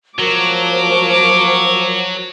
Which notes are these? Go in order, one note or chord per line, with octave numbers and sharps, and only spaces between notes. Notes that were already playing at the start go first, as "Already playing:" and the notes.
F3 F#3 F#4 A#4 D6